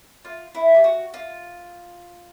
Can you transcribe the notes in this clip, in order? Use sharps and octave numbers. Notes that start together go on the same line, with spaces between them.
F4
E4
G4
F#4
F4